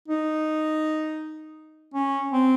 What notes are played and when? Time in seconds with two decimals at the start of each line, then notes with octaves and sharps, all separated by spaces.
0.08 D#4
1.94 C#4
2.32 C4